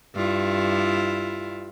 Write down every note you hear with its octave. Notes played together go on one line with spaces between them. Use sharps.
G2 E4 F4